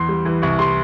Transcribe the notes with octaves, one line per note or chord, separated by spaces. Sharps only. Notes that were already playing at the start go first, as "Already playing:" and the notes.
Already playing: E2 C6
G3
E3
C2 C#6
G3 C6